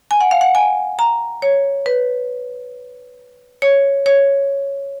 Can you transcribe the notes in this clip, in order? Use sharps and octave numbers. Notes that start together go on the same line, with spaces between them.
G#5
F#5
F5
F#5
G#5
A#5
C#5
B4
C#5
C#5